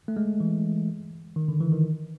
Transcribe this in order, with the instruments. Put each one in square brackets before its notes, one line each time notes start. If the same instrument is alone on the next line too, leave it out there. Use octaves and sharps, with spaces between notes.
[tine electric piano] A3
G#3
E3
D#3
D3
E3
D#3